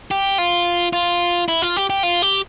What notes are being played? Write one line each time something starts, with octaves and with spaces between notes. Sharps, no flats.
G4
F4
F4
E4
F4
G4
G4
F4
G4